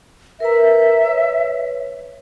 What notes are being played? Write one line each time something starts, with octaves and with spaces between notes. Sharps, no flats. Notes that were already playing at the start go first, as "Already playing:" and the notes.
A#4 B4 E5 A#5
B4 C#5